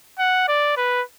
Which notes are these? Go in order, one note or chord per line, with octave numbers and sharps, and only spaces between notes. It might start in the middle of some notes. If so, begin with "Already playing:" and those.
F#5
D5
B4